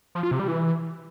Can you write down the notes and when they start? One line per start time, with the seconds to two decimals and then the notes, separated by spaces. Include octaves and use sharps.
0.15 F3
0.23 F4
0.31 C3
0.40 G3
0.48 E3